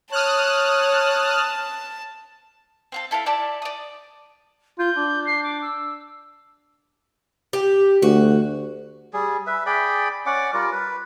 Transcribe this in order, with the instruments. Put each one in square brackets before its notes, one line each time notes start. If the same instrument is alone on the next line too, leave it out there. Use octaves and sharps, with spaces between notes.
[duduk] C#5 [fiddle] A5 [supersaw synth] D#6 F6 F#6
[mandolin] C4 F4 A4
E4 A4 E5 F5
E4 D5 E5 A5
D5 D#6
[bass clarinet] F4 [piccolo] G6
[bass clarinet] D4
[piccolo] C7
D6
E6
[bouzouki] G4
[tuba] D2 [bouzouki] F#4
[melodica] G3 G#4
B4 E5
G#4 D5 G5 B5
C#4 D5 F#5 D6
G3 F4 A#4 D5
B4